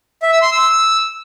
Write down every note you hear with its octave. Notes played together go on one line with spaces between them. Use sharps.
E5
E6
C6
E6